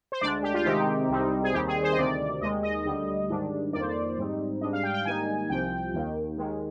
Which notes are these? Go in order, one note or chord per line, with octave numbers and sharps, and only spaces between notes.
C5
D2 D3 G#3 D4 D5
G4
F4
C3 D#3 G#3 C4 D#4 G4
C2 C3 G3 C4 D#4
G#4
D#2 D#3 G3 C4 G4
G#4
C5
D#5
D2 C3 D#3 D5
D#2 D#3 G#3 D#5
D#5
D2 D3 G3
G#2 D#3 G3 D4
F2 D#3 A#3 D5
C5
D5
G#2 G3 C4 D#4
G#2 G3 D4 D#5
F5
G5
G5
G#2 D#3 G3 A#3 D#4 G#5
C2 C3 F3 G5
D#2 D#3 A#3
D#2 D#3 G#3